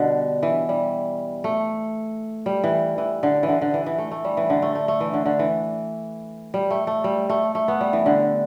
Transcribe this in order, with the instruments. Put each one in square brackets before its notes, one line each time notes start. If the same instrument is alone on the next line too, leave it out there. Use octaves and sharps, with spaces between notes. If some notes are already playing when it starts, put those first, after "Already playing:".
Already playing: [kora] B2 D3 G3
E3
G3
A3
G3
E3
E3
D3
E3
D3
D3
E3
E3
A3
A3
G3
E3
D3
A3
A3
A3
E3
D3
D3
E3
G3
A3
A3
G3
A3
A3
B3
G3
E3
D3